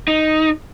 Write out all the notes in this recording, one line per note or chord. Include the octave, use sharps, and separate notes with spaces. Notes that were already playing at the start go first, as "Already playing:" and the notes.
D#4